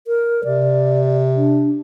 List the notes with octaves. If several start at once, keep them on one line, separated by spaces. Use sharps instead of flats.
A#4
C3 D5
D4